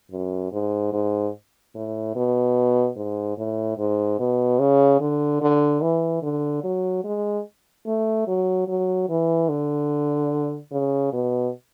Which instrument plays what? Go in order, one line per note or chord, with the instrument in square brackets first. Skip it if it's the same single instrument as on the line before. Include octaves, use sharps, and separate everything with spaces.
[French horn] F#2
G#2
G#2
A2
B2
G#2
A2
G#2
B2
C#3
D3
D3
E3
D3
F#3
G#3
A3
F#3
F#3
E3
D3
C#3
B2